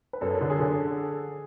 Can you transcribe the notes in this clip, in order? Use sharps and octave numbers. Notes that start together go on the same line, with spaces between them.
B4
F#2 A4
D3 A4
G#4
D3